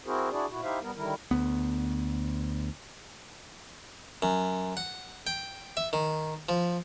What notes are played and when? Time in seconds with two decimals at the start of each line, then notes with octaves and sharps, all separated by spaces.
0.06 C4 E4 F#4 G#4 A#4 C5
0.31 D4 E4 F#4 G#4 D5
0.49 A#2 E4 F#4
0.63 D#4 E4 G4 C5 E5 F5
0.82 G3 B3 A#4
0.96 D3 D#3 G3 E4 A#4
1.31 D2 B3
4.22 F#2
4.77 F#5
5.27 G5
5.77 E5
5.93 D#3
6.49 F3